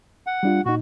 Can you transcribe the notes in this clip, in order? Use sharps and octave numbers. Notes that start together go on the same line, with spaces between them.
F#5
G3 D4 F4
A#2 D#4 F#4